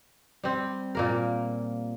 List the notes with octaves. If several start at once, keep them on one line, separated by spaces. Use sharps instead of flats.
G3 C4
A#2 A#3 A#4